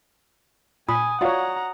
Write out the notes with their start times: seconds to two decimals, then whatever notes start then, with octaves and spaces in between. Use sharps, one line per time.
0.89 A#2 G#5 B5 D#6
1.21 F4 F#4 C#5 D5 F5 F#5 A#5